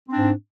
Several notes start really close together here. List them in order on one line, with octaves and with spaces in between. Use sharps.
C4 D4 G#2